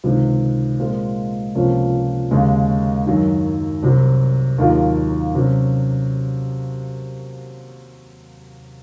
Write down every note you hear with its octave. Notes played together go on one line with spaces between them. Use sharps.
C#2 C3 D#3
A#2 G#3 C4 F4 A#4
C#2 C3 F3 A#3 C#4
D#2 C#3 G#3
F#2 D#3 F#3
C2 C3 F#3
D#2 D#3 F#3 A#3 F4
C3 F#3 C#4